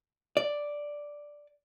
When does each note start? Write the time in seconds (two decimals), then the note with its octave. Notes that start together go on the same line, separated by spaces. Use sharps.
0.37 D5